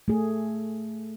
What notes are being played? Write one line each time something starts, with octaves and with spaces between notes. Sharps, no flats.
A3 G#4